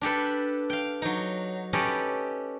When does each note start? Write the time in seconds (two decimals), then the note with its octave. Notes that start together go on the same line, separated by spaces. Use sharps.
0.01 D4 G4 A4 B4
0.70 F5 G5
1.02 F#3 D#4
1.73 C#4 G4 A4 B4 D5 D#5